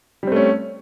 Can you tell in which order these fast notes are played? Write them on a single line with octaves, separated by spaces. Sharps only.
G3 C4 A3 C#4